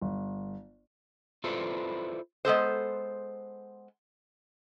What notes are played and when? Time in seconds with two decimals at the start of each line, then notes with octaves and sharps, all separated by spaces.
0.02 G1
1.44 E4 F4 A4 B4 C5 D5
2.45 G#3 B3 A4 C5